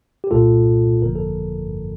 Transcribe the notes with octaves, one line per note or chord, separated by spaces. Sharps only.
G4
C2 A#2 A3 F4 A4
G1 F2 D3 F3 A#3 A#4
A4